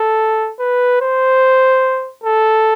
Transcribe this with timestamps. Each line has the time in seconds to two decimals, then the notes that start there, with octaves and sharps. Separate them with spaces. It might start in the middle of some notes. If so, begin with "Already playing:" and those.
Already playing: A4
0.59 B4
1.01 C5
2.24 A4